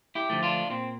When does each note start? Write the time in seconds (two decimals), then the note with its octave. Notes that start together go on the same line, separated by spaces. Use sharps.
0.15 E4 G4
0.30 D3 F3 A3
0.43 D4 F4
0.70 A#2 C4